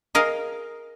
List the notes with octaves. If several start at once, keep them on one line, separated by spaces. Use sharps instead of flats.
G#4 A#4 D#5 F5